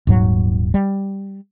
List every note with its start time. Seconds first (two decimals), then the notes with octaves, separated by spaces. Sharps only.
0.07 D#1 G#2 F#3
0.74 G3